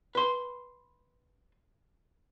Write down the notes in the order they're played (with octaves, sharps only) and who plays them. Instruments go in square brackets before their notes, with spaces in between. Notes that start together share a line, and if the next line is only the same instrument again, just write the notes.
[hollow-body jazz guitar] B4 C6